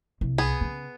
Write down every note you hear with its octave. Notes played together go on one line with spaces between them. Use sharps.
C2
B3 G#4
C#3